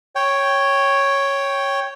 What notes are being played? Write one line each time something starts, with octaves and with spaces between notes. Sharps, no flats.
C#5 G5